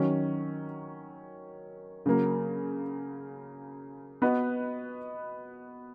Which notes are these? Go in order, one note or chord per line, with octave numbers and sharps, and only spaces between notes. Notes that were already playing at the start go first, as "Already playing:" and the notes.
Already playing: D#3 F#3 C#4
C#3 F#3 A#3
B3 F#4 B4 D#5